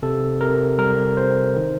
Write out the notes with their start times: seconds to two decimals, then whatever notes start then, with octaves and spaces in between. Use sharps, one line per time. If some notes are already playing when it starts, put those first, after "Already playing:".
0.03 C3 A4
0.41 C3 A#4
0.78 G3 A#4
1.17 C3 C5
1.56 D#3